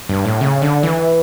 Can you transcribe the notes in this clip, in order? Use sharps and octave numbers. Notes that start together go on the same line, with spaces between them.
G2
A2
C#3
D3
E3